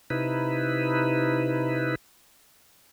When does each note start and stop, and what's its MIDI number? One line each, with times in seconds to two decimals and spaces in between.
0.10 1.95 48
0.10 1.95 63
0.10 1.95 64
0.10 1.95 71